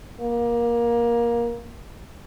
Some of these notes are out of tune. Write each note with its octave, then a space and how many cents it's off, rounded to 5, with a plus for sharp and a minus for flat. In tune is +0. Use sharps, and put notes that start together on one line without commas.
A#3 +20